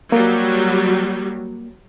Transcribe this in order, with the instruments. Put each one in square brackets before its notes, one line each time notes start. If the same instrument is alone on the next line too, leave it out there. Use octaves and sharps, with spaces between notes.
[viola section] F#3 G3 [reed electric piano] A#3